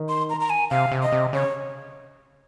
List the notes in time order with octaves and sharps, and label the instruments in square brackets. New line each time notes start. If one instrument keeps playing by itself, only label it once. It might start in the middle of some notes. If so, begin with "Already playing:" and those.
Already playing: [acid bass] D#3
[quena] C6
A#5
A#5
G#5
[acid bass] C3 [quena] F5
[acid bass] C3
[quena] D#5
[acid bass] C3
[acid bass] C#3 [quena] C#5